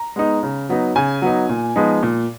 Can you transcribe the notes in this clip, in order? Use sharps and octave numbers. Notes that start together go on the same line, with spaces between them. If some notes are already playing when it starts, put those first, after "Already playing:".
Already playing: A#5
G#3 B3 D#4
C#3
F#3 B3 D#4
C#3 G#5
F#3 B3 D#4
A#2
F3 G#3 B3 D#4
A#2